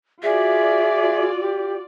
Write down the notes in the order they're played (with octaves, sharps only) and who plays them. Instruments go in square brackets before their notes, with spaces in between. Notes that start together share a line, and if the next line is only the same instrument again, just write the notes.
[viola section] F4 F#4 D5 [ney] G#4 [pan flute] E5
[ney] G4